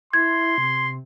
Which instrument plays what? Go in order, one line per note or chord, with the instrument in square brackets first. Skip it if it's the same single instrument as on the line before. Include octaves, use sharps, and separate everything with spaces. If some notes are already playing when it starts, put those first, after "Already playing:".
[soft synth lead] E4 [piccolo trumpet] C6 [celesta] G#6
[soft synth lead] C3